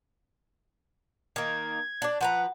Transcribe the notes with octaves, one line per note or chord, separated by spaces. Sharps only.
D#3 A#3 G#6
D4 D5
F3 B4 F#5 A#5